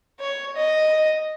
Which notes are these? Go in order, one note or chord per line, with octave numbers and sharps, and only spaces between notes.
C#5
D#5